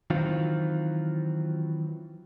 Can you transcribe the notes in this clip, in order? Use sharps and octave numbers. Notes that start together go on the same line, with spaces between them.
D#3 E3 F#3 C4 F4